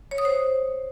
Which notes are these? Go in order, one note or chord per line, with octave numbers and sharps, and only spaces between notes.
C#5
D#6
C5